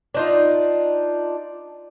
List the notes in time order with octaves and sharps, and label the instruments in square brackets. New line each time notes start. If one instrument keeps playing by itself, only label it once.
[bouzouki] D4 D#4 F4